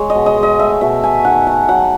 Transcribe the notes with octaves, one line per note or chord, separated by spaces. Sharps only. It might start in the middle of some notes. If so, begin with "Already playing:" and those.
Already playing: G#3 C#5
D#5
B2
D#5
G#3
D#5
A3 E5
B2 E5
A3 G#5
D#3 F#5
A3 G#5
F#3 F#5